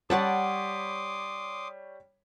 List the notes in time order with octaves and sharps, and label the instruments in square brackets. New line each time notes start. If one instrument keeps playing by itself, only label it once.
[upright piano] G3 C#5 [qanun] D5 F#5 A5 [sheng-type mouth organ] C6 D6 D#6